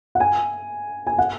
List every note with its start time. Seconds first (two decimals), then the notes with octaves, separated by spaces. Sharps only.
0.15 F#5
0.20 G#5
1.07 G#5
1.19 F#5